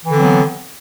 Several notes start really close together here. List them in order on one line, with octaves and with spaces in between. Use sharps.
E3 D3 C4 F#3 B3